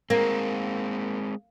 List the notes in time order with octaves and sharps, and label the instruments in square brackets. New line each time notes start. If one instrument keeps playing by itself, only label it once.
[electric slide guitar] G#3 C4 [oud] A#3